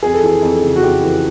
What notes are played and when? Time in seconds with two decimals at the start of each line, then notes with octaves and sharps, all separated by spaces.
0.03 F2 G#4
0.14 A4
0.23 E3 G#4
0.42 F2
0.63 C#3
0.76 F#4
0.83 F2 G4
1.03 E3